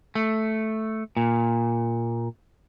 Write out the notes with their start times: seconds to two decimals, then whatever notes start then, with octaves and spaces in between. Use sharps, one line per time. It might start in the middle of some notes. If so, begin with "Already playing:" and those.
0.15 A3
1.17 A#2